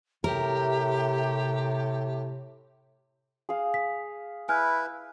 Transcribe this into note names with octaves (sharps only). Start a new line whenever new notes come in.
A2 C3 G4 A#4
G#4 F5
B6
E4 B4 G#5 F6